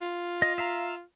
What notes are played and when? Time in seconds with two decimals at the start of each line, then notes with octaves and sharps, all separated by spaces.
0.02 F4
0.42 D#5
0.58 E5 F5 A#5